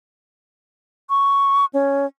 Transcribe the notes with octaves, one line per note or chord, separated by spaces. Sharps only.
C#6
C#4